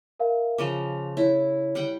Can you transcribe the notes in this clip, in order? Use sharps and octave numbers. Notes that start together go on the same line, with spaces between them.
A#4 E5 F5
C#3 F3 D#5 D6 F7
E4 C#5
G3 F#5 G5